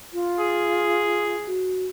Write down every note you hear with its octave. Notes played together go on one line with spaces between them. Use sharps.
F4
G#4
F#4